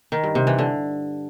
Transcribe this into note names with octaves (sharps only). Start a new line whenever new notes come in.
D#3
G2
C3
E3
D3